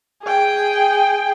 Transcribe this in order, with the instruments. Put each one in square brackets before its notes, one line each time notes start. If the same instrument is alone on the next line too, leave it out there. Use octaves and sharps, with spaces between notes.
[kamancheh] G#4 G5